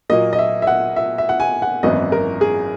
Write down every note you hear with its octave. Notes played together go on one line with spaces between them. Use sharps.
A#2 F#3 A#3 D#5
D#5
E5
E5
F#5
E5
E5
F#5
G#5
F#5
G#1 F#2 E3 B3 E4 D#5
A#4
G#4